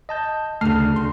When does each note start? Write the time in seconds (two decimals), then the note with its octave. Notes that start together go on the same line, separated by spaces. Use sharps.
0.09 D#5 A5 G6
0.61 D2 C#3 A3 F6
0.96 D2 C6